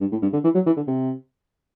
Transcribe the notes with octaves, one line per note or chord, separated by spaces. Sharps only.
G2
A2
G2
D3
E3
F#3
E3
D3
C3